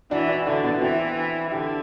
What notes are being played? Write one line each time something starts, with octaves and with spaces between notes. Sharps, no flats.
E3 D4 F#4
D4 F#4
D3 D4 F#4
B3 D4
F#4
E3 C4 E4
D3 E4 G4